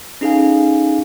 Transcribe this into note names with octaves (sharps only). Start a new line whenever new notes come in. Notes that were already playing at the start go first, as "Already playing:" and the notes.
C#4 D#4 G#4 A4 F5 G#5